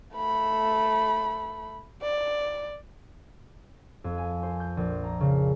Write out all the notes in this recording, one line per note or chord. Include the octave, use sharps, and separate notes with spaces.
A3 B5
D5
F2
G#5
C5
G6
A#1
A#5
C#3